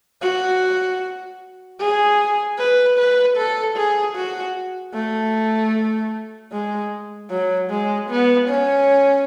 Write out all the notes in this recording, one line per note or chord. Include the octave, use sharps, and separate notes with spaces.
F#4
G#4
B4
B4
A4
G#4
F#4
A3
G#3
F#3
G#3
B3
C#4